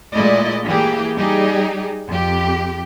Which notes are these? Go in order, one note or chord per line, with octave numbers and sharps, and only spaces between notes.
A#2 G#3 A3 E4 D5 D#5
E3 A#3 G4 G#4
G3 D#4 G4 G#4
F2 G4